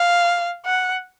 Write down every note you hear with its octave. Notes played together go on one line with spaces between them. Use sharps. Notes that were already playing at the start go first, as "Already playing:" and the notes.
Already playing: F5
F#5